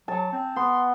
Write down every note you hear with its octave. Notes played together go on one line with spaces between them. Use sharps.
F#3 A5
C4
B3 C6